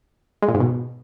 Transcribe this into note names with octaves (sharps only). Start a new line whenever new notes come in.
G#3
A#2
G#2
B2